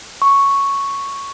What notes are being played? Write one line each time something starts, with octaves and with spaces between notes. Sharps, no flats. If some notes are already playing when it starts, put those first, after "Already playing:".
C#6